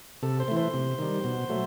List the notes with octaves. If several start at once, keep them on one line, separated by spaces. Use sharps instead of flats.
C3 A4
C5
E3 A3
C5
C3
D#3 G3
B2
F#3 A3